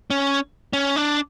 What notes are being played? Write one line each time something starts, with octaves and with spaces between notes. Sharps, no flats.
C#4
C#4
D4